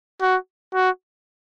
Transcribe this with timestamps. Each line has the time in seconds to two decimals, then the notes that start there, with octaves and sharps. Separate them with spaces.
0.21 F#4
0.74 F#4